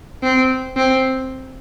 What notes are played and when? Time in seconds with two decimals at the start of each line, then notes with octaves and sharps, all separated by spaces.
0.23 C4
0.77 C4